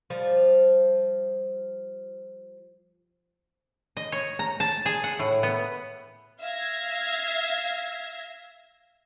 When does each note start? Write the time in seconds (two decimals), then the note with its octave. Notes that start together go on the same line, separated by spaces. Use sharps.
0.10 F3 G3
3.97 D#5
4.12 C#5
4.39 A#5
4.60 A5
4.86 G#4
5.04 F#5
5.19 A2
5.43 B3
6.42 E5 F5 G#6 A#6